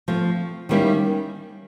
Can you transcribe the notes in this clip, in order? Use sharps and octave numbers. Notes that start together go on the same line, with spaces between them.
F3 A3 C4
D#3 G3 A#3 C#4 E4